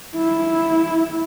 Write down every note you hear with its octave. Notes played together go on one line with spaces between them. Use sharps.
E4